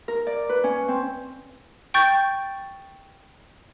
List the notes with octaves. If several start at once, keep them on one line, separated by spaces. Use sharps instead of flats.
A#4
D5
B4
C#4
C4
G5 C#6 G6 A6